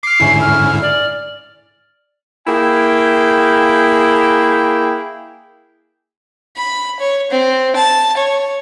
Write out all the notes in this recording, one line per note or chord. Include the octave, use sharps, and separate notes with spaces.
D6 F6 C7
G#2 D3 C#4 E4
F6
D5 F6
A#3 E4 G#4 F5 G5
B5
C#5
C4
A5
C#5